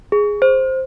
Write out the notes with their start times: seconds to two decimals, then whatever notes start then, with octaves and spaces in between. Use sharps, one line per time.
0.12 G#4
0.42 C5